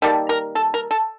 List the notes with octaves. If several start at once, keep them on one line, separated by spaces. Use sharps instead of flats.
D#3 G3 A#3 A4
A#4
A4
A#4
A4